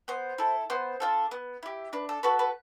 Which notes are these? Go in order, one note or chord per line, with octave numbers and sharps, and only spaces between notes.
B3 C5
E4 A4
B3 C5
D4 F4 A4
B3
E4 G4
D4 B4
A4
F#4 A4 B4
B4